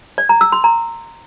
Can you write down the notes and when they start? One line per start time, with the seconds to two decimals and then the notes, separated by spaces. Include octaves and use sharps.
0.18 D5
0.29 A#5
0.41 E6
0.52 C6
0.64 A#5